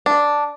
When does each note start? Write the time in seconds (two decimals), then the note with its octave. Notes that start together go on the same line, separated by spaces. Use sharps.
0.06 D4